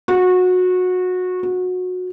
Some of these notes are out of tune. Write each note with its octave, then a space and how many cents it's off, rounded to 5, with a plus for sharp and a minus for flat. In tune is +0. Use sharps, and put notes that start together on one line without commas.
F#4 -20
F#4 -20